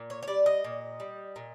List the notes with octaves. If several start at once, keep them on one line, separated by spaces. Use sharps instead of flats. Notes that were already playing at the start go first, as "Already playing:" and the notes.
Already playing: A#2
C#5
C#5
G3 D5
D#5
A#2
G3
A#2